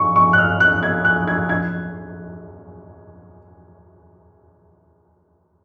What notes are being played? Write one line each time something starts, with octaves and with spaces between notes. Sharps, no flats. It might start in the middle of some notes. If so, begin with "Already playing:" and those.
Already playing: C#6
C#6
F#6
F6
F#6
G#6
F#6
G#6
G#6